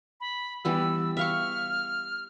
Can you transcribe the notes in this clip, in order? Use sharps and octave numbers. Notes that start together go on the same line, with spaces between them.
B5
E3 G3 B3 E6
E5 F5 C#6 F6